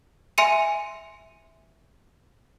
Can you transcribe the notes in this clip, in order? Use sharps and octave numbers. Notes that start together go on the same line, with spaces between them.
E5 G#5 C6 C#7 D#7